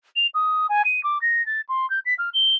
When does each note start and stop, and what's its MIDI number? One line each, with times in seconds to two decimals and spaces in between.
0.16 0.27 101
0.34 0.67 87
0.69 0.82 80
0.85 1.03 99
1.04 1.21 86
1.22 1.44 94
1.46 1.61 93
1.69 1.88 84
1.90 1.99 91
2.06 2.14 95
2.19 2.30 89
2.34 2.56 103